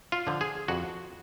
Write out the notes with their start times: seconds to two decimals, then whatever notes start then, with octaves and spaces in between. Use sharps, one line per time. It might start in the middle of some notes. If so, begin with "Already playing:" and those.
0.12 F4
0.27 D3 F3
0.41 G#4
0.68 F2 F#4